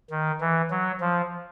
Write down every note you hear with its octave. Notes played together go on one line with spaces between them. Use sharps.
D#3
E3
F#3
F3